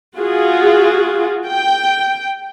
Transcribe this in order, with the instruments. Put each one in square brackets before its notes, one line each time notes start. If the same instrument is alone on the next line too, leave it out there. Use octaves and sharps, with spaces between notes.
[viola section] F4 F#4 G#4
G5